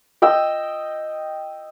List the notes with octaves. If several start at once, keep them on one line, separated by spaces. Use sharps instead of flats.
D#5 G5 E6